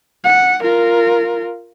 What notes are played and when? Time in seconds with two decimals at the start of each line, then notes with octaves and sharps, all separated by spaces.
0.24 F#5
0.63 F4 A#4